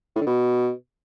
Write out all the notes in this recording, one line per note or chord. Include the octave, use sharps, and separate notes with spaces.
A2
D3
B2